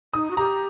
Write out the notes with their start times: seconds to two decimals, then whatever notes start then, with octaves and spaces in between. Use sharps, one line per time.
0.14 D#4 D#6
0.31 F#4
0.37 G4 A#5